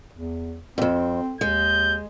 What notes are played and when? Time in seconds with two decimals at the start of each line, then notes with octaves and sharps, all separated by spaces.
0.13 E2
0.78 F2 G#2 C4
1.41 D#2 G#3 G6